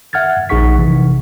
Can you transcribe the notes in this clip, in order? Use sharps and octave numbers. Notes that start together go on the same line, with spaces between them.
E5 F#5 F6 G#6 A6
A#1 D#4 G#4 F#5 C#6 B6
C3 E3